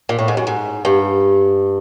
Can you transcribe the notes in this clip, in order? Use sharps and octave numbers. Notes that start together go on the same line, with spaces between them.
A#2
A2
G#2
F#2
G#2
G2